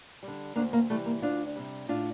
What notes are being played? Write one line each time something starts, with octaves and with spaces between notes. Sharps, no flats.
G3
D3
D2 A#3 D4
A#3
C3 E3 G3 A3
A#3
D2 D4 F4
C3 G3
A2 D4 F4